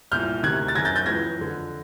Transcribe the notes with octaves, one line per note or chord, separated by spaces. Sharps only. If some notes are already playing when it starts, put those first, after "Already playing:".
C2 A#2 F6 G6
D2 C3 D#3 F#6 G#6
A6
F#2 D#3 G#6 A#6
G6 A6
G6 A6
C#2 C#3 E3 G#6 A#6
F2 D3